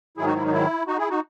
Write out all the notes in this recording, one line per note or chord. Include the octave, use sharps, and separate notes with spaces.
G#2 D#3 F#3 E4 G#4
D#4 F#4
E4
D#4
E4
D#4 F#4
E4 G#4
D#4 F#4